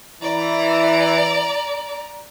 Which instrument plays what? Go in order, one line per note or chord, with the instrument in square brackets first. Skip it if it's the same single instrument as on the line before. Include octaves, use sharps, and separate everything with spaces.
[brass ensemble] E3 [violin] D5 A#5